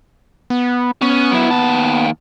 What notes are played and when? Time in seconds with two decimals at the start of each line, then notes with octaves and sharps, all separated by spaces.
0.50 B3
1.02 B3 C#4
1.32 F#3 E4
1.50 D#2 A5